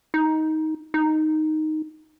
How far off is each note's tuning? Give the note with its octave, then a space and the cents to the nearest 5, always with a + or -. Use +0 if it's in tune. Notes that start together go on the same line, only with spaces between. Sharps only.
D#4 +15
D#4 +0